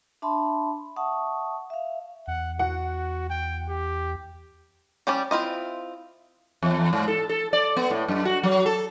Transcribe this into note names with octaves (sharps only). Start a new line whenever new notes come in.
D4 E5 A5 B5 C6
E5 F#5 A5 C#6 D#6
E5 F5
E2 F#5
F#4 F#5
G5
G4
G3 C#4 G4 D5
C4 E4 F4 D#5
E2
G#2
A4
A4
D5
B3
A2
F#2
F#4
F#3
A4